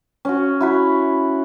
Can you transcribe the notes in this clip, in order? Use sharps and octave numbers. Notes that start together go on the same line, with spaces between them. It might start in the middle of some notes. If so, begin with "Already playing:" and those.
C#4 F#4
E4 F#4 B5